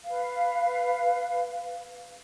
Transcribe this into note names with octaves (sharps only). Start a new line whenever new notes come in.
B4 F5